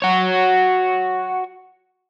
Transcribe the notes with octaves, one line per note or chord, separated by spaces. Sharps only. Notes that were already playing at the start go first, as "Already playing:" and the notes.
F#4 C#5